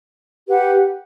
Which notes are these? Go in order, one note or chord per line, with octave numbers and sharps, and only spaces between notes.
G4 B4 F#5